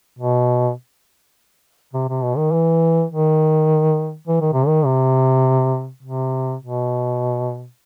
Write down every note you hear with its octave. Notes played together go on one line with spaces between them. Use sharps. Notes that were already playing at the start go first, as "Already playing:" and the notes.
B2
C3
C3
B2
D#3
E3
D#3
E3
D#3
C3
D#3
C3
C3
B2